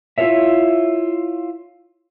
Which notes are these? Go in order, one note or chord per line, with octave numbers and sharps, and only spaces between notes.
E4 F4 A4 A#4 C#5 E5